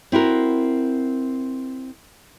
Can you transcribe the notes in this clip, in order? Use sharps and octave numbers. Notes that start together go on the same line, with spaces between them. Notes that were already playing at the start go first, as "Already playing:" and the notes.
C4 E4 F#4 A#4